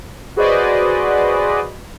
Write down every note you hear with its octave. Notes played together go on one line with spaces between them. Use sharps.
F#4 G#4 B4 C5 D5 D#5